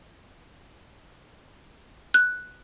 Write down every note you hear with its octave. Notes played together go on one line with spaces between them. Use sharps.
F#6